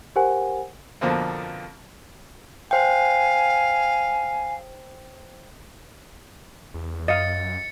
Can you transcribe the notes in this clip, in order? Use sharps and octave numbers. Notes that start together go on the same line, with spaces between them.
G4 A#4 C5 F#5 G#5
F2 B2 D3 F3 A#3 C4
C5 F5 G5 G#5
E2
F#2 D#5 F5 A6 C#7